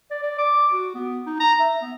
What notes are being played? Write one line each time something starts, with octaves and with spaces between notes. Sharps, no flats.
D5
D5
D6
F#4
B3
D#4
A#5
E5
B3